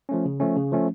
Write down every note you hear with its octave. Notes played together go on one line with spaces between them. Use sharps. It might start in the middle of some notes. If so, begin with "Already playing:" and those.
F3 A3 C#4
C#3
F3 A3 C#4
C#3
F3 A3 C#4